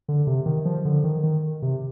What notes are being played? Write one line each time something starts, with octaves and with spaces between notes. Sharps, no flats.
D3
C3
D#3
F3
D3
D#3
D#3
C3